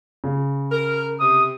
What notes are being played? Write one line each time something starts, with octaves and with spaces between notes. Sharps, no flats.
C#3
A#4
C3 D#6